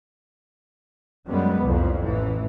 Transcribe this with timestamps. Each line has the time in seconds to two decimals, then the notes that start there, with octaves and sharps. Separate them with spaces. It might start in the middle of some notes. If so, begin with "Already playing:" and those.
1.27 F#2 G3 G#3 B3
1.65 C2 F2 A#2
2.02 A1 E3